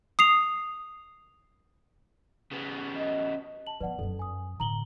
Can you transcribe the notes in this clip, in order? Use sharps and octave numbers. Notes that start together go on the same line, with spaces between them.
D#6 C7 F7
C#3 B3
D#5
A5 F#7
F3 B3 B4 D5 F#5
F#2 F#3 A4
G#5 D#6
A2 D3 A#5 F#7 G7